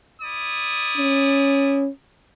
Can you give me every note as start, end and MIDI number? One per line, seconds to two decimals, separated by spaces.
0.21 1.84 64
0.21 1.84 74
0.21 1.84 87
0.97 1.89 61